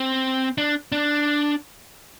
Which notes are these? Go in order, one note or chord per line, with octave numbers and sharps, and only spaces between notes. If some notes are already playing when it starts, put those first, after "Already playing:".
Already playing: C4
D4
D4